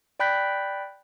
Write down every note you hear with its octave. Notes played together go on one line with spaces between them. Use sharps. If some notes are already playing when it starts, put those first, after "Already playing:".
D5 G5 B5 F#6 G6 B6